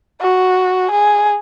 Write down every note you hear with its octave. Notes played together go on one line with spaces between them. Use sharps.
F#4
G#4